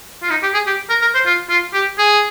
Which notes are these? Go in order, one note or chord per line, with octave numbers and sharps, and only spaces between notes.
F4
D#4
G4
G#4
G4
A#4
A#4
C5
F4
F4
G4
G#4